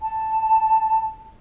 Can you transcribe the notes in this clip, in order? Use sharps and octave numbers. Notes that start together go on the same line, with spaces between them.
A5